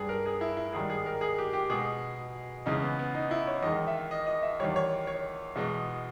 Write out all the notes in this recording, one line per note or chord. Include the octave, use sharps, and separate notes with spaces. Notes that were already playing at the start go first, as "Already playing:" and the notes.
Already playing: G2 G3 G#4
A#4
G#4
E4
E4
G#2 D#3 G3 G#4
G#4
A#4
G#4
G4
G4
B2 G#3 G#4
E2 C#3 E3 G#3 D#4
B3
B3
D#4
E4
C#5
E2 D#3 G#3 D#5
E5
D#5
D#5
E5
E2 D#3 G3 C#5
C#5
C#5
E2 B2 G#3